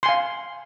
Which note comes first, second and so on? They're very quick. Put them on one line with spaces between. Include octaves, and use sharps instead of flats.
C6 G#5 F5